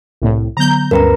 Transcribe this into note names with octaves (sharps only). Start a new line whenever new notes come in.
C2 A2
D3 F#3 B3 A#5 G6
D2 G2 C#4 A#4 B4 A#5